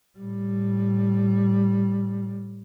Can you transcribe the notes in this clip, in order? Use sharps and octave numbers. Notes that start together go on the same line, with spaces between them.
A2 G3